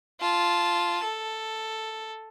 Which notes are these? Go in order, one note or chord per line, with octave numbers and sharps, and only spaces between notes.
F4 A5
A4